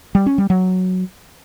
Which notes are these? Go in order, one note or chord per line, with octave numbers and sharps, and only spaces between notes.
G3
C#4
G3
F#3